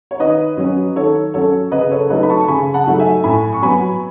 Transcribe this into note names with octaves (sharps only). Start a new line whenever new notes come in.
C#5
D#3 B4 D#5
F#3 C#4
D#3 A4 C#5
F#3 C#4 A4 C#5
C#3 B4 D#5
A4 C#5
F#3 A3 D#4 B4 D#5
B5
A5 C#6
C#6
C#3 G#5 B5
F#5 A5
F#3 A3 D#4
E5 G#5
A2 G#5 B5
C#6
F#3 B3 G#5 B5